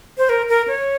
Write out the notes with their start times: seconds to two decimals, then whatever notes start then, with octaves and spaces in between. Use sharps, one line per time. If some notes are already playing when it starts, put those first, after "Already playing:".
0.18 C5
0.29 A#4
0.49 A#4
0.68 C#5